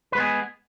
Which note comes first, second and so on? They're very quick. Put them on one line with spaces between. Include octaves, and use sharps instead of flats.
B4 G#3 B3 G#4